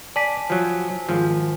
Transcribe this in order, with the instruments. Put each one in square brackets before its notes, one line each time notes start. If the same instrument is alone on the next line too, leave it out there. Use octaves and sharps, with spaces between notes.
[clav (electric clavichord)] D5 [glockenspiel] G#5 A5 B6
[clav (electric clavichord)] F3 F#3
G#1 F3